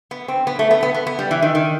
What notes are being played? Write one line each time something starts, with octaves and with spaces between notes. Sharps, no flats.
B3
C4
B3
A3
B3
B3
B3
B3
G3
E3
D#3
D#3